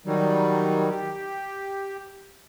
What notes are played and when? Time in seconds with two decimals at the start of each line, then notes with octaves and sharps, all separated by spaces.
0.06 D#3 F#3 G3
0.90 G4